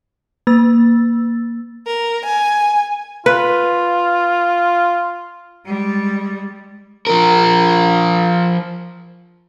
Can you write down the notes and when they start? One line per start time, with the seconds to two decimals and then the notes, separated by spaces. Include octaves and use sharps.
0.47 A#3 E6 A6
1.86 A#4
2.25 G#5
3.26 F4 B4
5.66 G3 G#3
7.07 F3 A#4